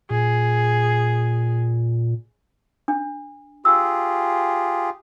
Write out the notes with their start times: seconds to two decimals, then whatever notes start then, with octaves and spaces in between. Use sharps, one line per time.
0.10 A#2 G#4
2.88 D4
3.65 F4 G4 G#4 E6